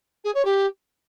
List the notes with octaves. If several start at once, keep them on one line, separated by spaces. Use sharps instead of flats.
G#4
C#5
G4